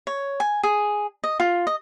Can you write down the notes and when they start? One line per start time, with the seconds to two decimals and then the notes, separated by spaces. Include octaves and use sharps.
0.07 C#5
0.40 G#5
0.63 G#4
1.24 D#5
1.40 F4
1.67 D#5